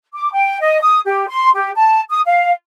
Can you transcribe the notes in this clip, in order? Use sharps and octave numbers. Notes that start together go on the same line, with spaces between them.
D6
G5
D#5
D#6
G4
C6
G4
A5
D#6
F5